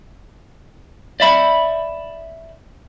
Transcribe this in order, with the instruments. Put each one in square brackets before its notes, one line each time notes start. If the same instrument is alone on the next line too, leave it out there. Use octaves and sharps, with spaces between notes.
[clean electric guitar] D5 E5 B5